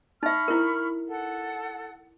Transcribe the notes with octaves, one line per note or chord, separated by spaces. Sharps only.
D#4 E5 B5 C#6 F6
E4 A#4
A4 F#5